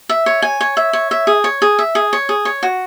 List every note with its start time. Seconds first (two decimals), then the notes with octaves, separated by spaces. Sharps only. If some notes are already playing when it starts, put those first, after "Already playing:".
0.09 E5
0.26 C#5
0.42 G#5
0.61 C#5
0.77 E5
0.93 C#5
1.11 E5
1.27 G#4
1.44 C#5
1.62 G#4
1.79 E5
1.95 G#4
2.13 C#5
2.29 G#4
2.45 C#5
2.63 F#4